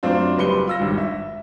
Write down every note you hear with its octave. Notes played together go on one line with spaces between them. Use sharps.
F#2 A3 C4 D4 F4
F#1 G3 B4 C6 C#7 G7
F4 E6 A#6
G#1 G2
E5